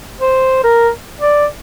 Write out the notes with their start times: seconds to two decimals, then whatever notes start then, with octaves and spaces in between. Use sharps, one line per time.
0.21 C5
0.64 A#4
1.20 D5